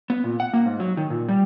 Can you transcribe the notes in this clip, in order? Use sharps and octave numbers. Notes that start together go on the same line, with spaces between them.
B3
A#2
F#5
A#3
G#2
F#3
D#3
A#2
G3